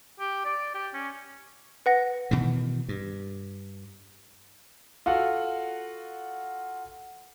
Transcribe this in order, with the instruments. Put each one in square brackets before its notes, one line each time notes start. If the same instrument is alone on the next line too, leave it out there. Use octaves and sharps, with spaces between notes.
[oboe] G4
D5
G4
C#4
[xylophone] B4 F#5 A#6
[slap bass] B2 D#3 E3
G2
[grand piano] F4 F#4 A4 F#5